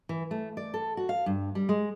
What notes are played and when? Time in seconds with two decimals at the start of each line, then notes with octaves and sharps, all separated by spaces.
0.09 E3
0.31 A3
0.57 D5
0.74 A4
0.97 F#4
1.09 F5
1.26 G2
1.55 G3
1.69 G#3